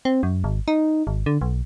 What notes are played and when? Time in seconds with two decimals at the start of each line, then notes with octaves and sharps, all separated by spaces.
0.05 C4
0.23 F#2
0.44 G#1
0.68 D#4
1.07 G#1
1.26 D3
1.41 B1